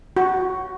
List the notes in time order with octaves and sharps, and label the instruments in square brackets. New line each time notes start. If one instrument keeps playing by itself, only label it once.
[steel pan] F#4